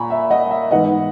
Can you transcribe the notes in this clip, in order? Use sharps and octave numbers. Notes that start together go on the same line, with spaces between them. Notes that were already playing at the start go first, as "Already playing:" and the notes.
Already playing: A#2 G#5 A#5 B5 C#6
E5
D#5 F#5
E5
G#2 E3 B3 D#5 F#5